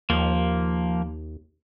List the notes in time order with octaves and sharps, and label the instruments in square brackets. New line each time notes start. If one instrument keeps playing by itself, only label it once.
[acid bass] D#2 [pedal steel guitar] F3 A#3